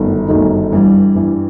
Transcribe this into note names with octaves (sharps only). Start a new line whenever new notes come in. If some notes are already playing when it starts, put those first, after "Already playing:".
Already playing: G1 F#2 D#3 A3
G1 F#2 D#3 A3 D#4
G2 E3 G3
G2 E3 G3